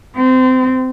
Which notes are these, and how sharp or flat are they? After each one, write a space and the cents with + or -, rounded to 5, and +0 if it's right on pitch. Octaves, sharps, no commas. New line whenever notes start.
C4 -25